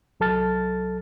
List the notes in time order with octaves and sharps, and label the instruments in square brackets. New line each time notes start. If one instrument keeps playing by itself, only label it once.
[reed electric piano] C2 F#3 A4 A5 F6 A6